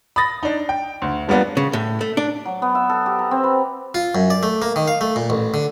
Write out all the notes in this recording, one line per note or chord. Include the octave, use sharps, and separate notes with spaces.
B5 D#6 A6 A#6
D4 D#4
G5
D2
F3 G3 A#3 B3 D4
C#3
A2
A3
D4
F#3
B3
E5
A4
G4
A#5
C4
B4
F4
F#2
D5
A3
A#3
D#3
F5
A3
A#2
A1
D3